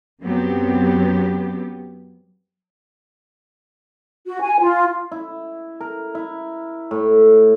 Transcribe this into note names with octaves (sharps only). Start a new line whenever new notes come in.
F#2 F#3 B3 C4 G4
F#4
G#5
F4
E4
A#4
E4
A2